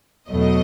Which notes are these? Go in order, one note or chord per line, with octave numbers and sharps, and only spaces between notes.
E2 B2 F#3 A3 D#5